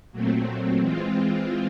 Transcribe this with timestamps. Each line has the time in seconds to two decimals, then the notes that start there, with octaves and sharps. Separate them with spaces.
0.12 A#2 F#3 A3 C4
0.79 E3 G#3 C4 F4